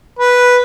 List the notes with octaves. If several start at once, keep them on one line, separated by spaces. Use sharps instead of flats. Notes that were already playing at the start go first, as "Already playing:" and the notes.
B4